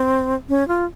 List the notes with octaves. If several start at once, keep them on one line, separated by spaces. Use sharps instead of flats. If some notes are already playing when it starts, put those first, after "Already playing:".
Already playing: C4
C#4
F4